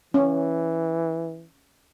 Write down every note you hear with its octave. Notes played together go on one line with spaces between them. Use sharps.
E3 C#4